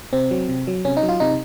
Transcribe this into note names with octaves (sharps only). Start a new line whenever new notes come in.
C3 C4
F#3
C3
F#3
C3 C#4
D#4
F#3
F4
C3 D#4